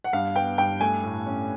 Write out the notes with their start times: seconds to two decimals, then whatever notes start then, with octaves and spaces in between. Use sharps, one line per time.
0.04 F#5
0.13 G2 F5
0.36 B3 G5
0.58 G2 G5
0.80 A3 G#5
1.04 A2
1.26 C#4